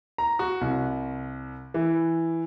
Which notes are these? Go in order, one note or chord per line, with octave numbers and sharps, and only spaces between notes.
A#5
F#4
C2
E3